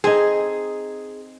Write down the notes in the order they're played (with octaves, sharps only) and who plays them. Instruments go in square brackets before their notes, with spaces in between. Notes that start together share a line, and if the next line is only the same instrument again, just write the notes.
[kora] C4 D#4 [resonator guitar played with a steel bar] G#4